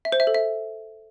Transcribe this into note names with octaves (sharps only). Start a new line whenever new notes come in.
E5
C5
E5
A4
E5